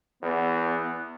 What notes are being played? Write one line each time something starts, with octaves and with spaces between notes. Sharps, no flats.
E2 B3